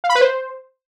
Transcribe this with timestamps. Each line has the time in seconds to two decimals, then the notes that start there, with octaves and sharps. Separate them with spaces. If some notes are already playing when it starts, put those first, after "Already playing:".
0.04 F5
0.10 B5
0.15 B4
0.21 C5